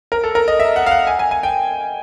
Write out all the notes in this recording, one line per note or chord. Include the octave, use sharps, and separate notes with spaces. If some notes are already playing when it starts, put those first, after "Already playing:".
A#4
A4
A#4
D#5
E5
F#5
F5
F#5
G#5
G#5
G#5
G5